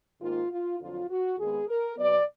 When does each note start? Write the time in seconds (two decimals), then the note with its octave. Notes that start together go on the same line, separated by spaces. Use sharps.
0.21 G#2 D#3 A#3 F4
0.51 F4
0.80 F2 D3 F#3 F4
1.09 F#4
1.39 D#2 D#3 G#3 B3 G#4
1.68 A#4
1.97 B2 F#3 B3 D5